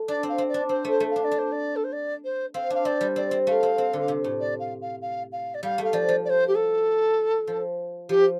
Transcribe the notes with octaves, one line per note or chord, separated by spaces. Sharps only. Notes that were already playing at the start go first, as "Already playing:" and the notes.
Already playing: A3
D4 D5
C4
F5
C4
D5
D4
C4 C5
A3
C5
A3
F5
D4
D5
D4
C5
D5
A4
C5
D5
C5
C4 F5
D4 F5
C4 D5
G3
C4 D5
C4
A3 F5
C4
C4
D3
C3
A2
D5
F5
F5
F5
F5
D5
G3 F5
A3
F5
F3 D5
F3
D5
C5
G4
A4
F3
F3 G4